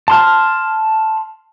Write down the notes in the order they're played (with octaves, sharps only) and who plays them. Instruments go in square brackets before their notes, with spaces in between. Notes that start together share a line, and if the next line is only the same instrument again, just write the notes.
[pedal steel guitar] A5 C6 F6